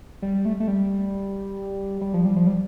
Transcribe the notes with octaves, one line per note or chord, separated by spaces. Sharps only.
G3
A3
A3
G3
G3
F3
G3
F3
G3